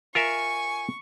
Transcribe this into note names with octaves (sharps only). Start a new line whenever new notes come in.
F4 A#4 E5 G#5 C#6